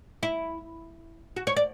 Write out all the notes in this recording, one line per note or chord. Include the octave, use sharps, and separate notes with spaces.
E4
F#4
C#5
D5